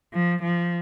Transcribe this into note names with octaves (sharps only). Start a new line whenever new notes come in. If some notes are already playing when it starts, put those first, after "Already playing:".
F3
F3